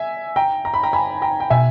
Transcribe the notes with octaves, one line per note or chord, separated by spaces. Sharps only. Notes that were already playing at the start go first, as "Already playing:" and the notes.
Already playing: E5 G#5
G5 A#5
A#5
B5
G5 A#5
G#5 B5
G5 A#5
G5
B2 E5 G#5